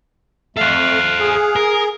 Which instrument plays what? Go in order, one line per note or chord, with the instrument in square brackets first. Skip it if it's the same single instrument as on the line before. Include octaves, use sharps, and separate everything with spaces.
[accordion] F2 A3 [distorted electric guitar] A4 C5 [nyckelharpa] F5 F#5
[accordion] G#4
[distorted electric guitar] A#4